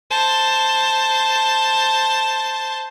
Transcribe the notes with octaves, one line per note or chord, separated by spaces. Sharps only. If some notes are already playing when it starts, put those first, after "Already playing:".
C5 A5